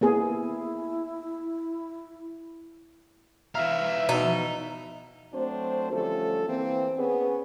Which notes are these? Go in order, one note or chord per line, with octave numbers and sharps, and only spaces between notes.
A#3 B3 E4 G#4
E3 E5 F5 A#5
B2 D#4
F#3 A3 C4 D4 C5
D3 F3 G3 A3 C#4 A4
E3 A#3 C4
B3 C#4 G#4 B4